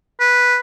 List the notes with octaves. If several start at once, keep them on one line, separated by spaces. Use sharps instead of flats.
B4